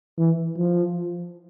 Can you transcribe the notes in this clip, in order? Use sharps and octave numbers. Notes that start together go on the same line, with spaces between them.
E3
F3